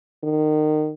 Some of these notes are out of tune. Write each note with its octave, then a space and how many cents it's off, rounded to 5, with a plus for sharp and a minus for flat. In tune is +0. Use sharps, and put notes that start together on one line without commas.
D#3 -25